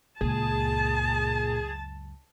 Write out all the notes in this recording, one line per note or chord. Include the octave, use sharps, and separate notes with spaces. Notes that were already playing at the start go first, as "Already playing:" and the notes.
C#2 F#2 A#2 G#4 A5